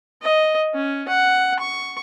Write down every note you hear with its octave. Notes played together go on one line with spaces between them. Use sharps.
D#5
C#4
F#5
C#6